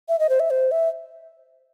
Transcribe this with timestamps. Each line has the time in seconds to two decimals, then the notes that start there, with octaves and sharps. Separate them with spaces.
0.09 E5
0.19 D#5
0.29 C5
0.40 E5
0.50 C5
0.71 E5